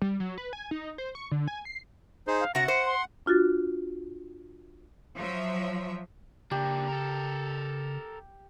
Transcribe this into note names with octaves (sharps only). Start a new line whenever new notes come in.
G3
F#3
B4
G#5
D#4
C5
C#6
D3
G#5
C7
D#4 G#4 C5
F5
C3 F#4 F#5 A#6
C5 C#7
C6
D4 F4 F#4 A6
F3 F#3 E5
C#3 A#3 D4 G4
A4 A#4